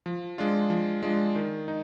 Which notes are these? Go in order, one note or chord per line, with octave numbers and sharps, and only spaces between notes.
F3
G#3 D4 F4
F3
G#3 D4 F4
D#3
D#4